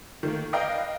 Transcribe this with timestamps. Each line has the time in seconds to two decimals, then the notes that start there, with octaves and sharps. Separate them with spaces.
0.23 D#3 A3 A#3
0.53 A#4 B4 D5 D#5 F5 G5